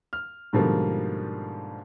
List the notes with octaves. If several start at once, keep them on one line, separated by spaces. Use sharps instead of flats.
F6
G#2 B2 D3 F3 G3 A#3